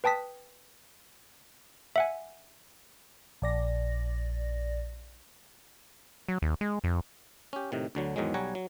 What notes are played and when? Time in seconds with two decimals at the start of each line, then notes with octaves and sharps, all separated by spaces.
0.04 B4 G5 A5 D#6 B6
1.96 E5 F#5 G#5
3.42 A#1 D5 A#6
6.28 F#3
6.42 D#2
6.61 G#3
6.84 F2
7.53 C#4 G4
7.72 A2 C3 D#3
7.95 D2 D3 F#3
8.16 E2 G#2 D#3 F#3 G#3
8.34 B1 G3 C#5 F#5 G#5 A#5
8.55 F#3